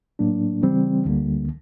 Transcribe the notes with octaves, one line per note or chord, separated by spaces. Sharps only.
A2 F#3 A#3 D4
C#3 E3 G3 C4
D2 D3 G3 A#3